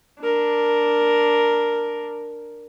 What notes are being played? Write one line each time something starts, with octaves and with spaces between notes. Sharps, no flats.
D4 A#4